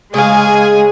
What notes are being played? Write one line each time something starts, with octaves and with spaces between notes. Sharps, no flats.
C#3 G#3 G#4 F5 G#5